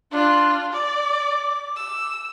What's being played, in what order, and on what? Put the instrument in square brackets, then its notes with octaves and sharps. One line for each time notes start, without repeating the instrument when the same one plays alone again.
[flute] D4 [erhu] F4
[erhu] D5 [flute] D6
[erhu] E6